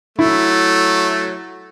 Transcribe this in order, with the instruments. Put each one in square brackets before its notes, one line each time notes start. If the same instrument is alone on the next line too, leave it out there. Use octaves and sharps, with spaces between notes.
[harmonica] F#3 A3 [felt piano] E4